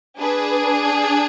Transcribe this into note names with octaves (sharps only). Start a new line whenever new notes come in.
D4 G#4 B4